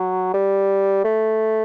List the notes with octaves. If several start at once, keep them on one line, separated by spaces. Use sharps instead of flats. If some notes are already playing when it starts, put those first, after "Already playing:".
Already playing: F#3
G3
A3